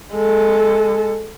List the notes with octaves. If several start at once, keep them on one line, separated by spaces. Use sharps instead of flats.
G#3 A4